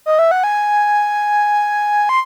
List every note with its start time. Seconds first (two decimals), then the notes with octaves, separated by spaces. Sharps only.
0.06 D#5
0.19 E5
0.31 F#5
0.44 G#5
2.09 C6